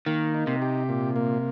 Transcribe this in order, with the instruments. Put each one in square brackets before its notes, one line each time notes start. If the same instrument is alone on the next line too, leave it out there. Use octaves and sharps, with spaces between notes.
[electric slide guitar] D#3 [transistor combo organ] A#3
[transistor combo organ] D#4
[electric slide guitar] C3
[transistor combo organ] G4
A#2
A#3